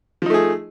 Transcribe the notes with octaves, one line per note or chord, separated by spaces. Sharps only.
F3 A3 D#4 G#4